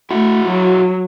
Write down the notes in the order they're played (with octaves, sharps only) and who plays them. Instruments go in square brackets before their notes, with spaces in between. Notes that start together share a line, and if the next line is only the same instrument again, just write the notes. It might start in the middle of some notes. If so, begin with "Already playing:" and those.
[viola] A3 [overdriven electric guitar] E4 F#4
[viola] F#3